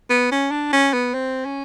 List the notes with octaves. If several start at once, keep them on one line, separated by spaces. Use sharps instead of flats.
B3
C#4
D4
C#4
B3
C4
C#4